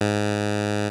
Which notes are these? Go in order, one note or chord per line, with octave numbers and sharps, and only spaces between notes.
G#2